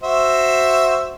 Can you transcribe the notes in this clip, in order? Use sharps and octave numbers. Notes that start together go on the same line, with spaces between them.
F#4 C5 E5